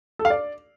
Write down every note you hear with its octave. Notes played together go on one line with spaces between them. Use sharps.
A4
F5
D5